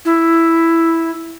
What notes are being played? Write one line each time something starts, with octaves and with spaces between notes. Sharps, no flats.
E4